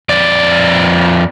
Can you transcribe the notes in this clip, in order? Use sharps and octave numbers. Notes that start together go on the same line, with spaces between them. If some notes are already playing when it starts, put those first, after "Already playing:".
F2 D5